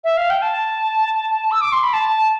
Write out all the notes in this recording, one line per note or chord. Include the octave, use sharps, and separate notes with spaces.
E5
F5
G5
A5
E6
D6
C6
B5
A5